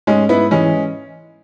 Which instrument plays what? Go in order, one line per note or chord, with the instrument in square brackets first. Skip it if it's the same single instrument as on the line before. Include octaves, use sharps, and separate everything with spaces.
[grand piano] G#2 [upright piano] G#3 C#4
[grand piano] G#2 [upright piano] B3 E4
[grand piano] E3 [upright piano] G#3 C#4